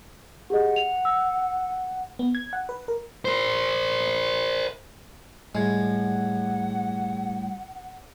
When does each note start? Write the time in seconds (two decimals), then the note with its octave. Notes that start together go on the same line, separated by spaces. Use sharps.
0.50 G4 G#4 D#5 F#5
0.76 F7
1.05 E6
2.19 B3
2.35 G#6
2.53 F#5
2.69 B4
2.88 A#4
3.25 A#4 C5
5.55 A2 G3 G#3 F#5 G#6